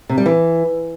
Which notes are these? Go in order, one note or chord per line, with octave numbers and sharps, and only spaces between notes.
C3
G3
E3